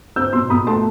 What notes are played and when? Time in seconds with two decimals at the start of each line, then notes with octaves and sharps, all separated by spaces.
0.16 C4 E6 G6
0.33 B2 C6 E6
0.50 B2 B5 D#6
0.67 A3 A5 C6